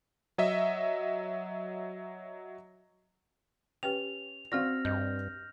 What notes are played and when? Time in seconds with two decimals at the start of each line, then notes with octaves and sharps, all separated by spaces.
0.38 F#3 D#5 E5 B6
3.83 C#4 G4 B4 G5 F7
4.52 C4 F#4 D5 F5 F6 A#6
4.85 G2 D#5 G6